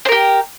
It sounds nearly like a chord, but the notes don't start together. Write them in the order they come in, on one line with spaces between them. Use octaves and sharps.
C5 A#4 G4